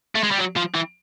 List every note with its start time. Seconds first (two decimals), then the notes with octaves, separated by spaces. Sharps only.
0.15 A3
0.23 G#3
0.31 G3
0.39 F#3
0.57 F3
0.75 E3